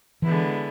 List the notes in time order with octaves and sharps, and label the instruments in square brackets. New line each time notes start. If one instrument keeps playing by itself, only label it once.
[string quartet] D3 G#3 B3 E4 [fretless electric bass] E3